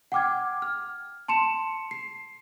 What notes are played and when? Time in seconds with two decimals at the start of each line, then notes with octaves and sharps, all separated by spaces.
0.12 F#5 G5 D6 F6 G#6
0.62 F6
1.28 A5 C6 C#7 E7
1.91 C7